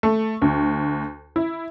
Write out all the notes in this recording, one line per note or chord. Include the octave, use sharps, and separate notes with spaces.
A3
D2
E4